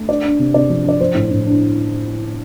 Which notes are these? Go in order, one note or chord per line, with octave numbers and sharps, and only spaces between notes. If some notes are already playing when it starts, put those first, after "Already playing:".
Already playing: A3
D4 D5
D4
C3
C3 D5
F3
D4 D5
F3 C5
A2
A2
D4